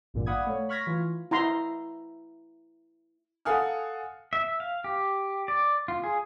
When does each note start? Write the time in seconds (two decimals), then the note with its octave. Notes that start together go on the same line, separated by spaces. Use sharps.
0.14 A1 G2 A#2 D3
0.26 D5 F5 F#5 B5 D#6 G#6
0.46 A3 C#5
0.69 B5 C#6 F6 G#6 A#6 B6
0.87 E3 F4
1.31 E4 A#5 C6
3.45 A4 F5 F#5 G#5 D#6 F6
4.33 E5
4.60 F5
4.84 G4
5.48 D5
5.88 F4
6.04 G#4